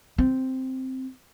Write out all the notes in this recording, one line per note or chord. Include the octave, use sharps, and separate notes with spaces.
C4